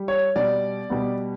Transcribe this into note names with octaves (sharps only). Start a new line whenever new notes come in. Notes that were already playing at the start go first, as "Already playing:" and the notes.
Already playing: G3
C#5
B2 G3 B3 D5
B2 G3 B3